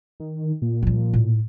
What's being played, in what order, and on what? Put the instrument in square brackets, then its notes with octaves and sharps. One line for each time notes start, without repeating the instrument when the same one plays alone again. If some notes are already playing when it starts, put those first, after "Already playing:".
[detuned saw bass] D#3
A#2
[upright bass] F3 G3
A2